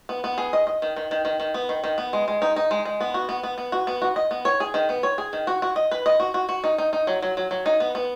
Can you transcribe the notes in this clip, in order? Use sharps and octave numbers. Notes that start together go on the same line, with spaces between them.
B3
B3
G#4
D#5
D#5
D#3
D#3
D#3
D#3
D#3
B3
D#3
D#3
B3
G#3
G#3
D#4
D#4
G#3
G#3
B3
F#4
B3
B3
B3
F#4
B3
F#4
D#5
B3
C#5
G#4
D#3
B3
C#5
G#4
D#3
F#4
F#4
D#5
B4
D#5
F#4
F#4
F#4
D#4
D#4
D#4
F#3
F#3
F#3
F#3
D#4
B3
B3